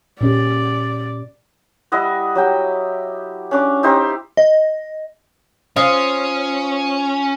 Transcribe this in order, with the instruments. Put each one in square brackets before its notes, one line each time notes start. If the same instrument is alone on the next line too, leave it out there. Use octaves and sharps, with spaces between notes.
[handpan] A#2 C#4 G4 [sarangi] D5
[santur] G3 E4 D#5 F#5
F#3 G4 G5
C#4 D4 D6
D#4 E4 G4 C5
[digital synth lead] D#5
[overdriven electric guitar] C#4 [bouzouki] F4 [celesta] C5 D#6